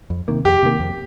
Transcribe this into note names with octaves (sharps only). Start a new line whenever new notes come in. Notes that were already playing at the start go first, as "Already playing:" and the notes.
F2
C3 D#3 A#3
F2 G4
C3 D#3 A#3
F2